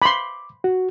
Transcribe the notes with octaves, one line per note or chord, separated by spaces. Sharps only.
B5 C6 D6
F#4